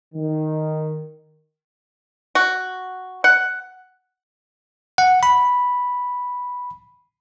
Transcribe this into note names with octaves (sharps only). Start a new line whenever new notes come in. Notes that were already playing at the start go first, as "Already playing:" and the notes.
D#3
F#4
F#5
F#5
B5